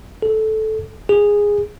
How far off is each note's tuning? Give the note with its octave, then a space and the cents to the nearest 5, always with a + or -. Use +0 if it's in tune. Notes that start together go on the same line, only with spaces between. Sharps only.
A4 -10
G#4 -10